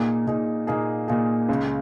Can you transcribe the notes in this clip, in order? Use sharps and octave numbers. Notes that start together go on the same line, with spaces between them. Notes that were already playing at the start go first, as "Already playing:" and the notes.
Already playing: A#2 A#3 D#4 G#4
A#2 A#3 D#4 G#4
A#2 A#3 D#4 G#4
A#2 A#3 D#4 G#4
C#2 C#3 G#3